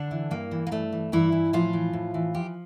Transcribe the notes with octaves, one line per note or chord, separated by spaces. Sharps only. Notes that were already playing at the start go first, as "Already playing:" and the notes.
Already playing: D3 D4
E3
G2 A#3
E3
A#3
G2 A3
E3
G2 E3 E4
E3
A2 F3 F4
E3
A2
E3
F3 G4